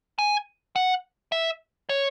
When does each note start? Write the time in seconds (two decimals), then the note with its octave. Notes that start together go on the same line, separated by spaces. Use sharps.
0.19 G#5
0.76 F#5
1.32 E5
1.89 C#5